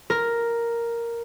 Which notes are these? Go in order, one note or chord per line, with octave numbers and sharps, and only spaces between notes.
A#4